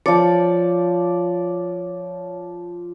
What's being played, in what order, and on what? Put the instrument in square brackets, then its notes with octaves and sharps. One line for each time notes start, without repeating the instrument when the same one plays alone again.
[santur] F3 D5 [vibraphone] C#5